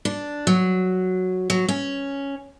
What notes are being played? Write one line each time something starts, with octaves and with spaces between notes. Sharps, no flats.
D4
F#3
F#3
C#4